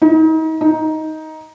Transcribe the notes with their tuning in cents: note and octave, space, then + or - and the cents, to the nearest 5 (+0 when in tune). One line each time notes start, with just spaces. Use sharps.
D#4 +35
D#4 +10